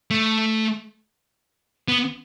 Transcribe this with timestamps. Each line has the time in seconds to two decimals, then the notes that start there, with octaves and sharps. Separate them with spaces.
0.11 A3
1.88 B3